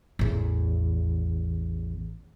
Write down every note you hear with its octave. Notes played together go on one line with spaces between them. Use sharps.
A1 E2